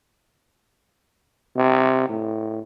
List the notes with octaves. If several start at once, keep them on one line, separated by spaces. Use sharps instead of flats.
C3
A2